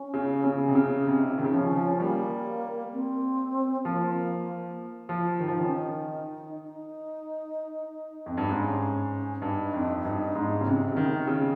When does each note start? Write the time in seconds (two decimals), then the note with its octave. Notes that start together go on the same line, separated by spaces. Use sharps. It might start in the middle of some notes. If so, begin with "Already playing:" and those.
Already playing: C#4
0.14 C#3
0.44 C#3
0.68 C3
0.75 C#3
1.06 C3 D#4
1.30 C#3
1.38 D#3
1.44 C#3
1.52 F3 C#4
1.76 F3
1.99 G3 A#3
2.92 C4
3.85 F3 A#3
5.09 F3
5.40 D#3
5.48 F3
5.57 D#3 C#4
5.71 D#4
6.63 D#4
8.26 F2
8.37 G2 D#4
8.49 G#2 C#4
9.42 G2 D#4
9.74 F2
10.05 G2
10.35 G#2
10.61 C#3
10.66 C3
10.92 C#3
10.97 D#3
11.27 C#3 D#4